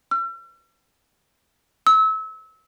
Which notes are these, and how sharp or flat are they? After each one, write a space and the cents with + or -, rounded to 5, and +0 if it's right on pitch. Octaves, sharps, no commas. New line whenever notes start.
E6 +45
E6 -30